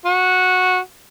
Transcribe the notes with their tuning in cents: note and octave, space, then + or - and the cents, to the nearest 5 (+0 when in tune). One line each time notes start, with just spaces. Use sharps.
F#4 -10